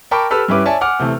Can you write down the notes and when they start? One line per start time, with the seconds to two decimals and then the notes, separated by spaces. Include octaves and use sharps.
0.11 A#4 G5 A5 B5 C#6 D6
0.30 G4 A4 B4 B5 E6 F6
0.48 G2 C#4 E4 G4 B4 D6
0.66 C#5 D5 E5 G#5 A5
0.81 F#5 G#5 D6 F6
0.99 C3 E3 A3